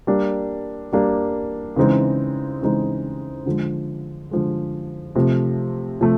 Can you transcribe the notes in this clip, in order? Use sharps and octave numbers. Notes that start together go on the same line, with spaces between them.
G3 A#3 D4
G3 A#3 D4
C#3 E3 G#3 C4 D#4
C#3 E3 G#3 C4 D#4
D3 F3 G#3
D3 F3 G#3
C3 F3 A3
C3 F3 A3